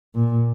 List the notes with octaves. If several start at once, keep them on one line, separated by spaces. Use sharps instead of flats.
A#2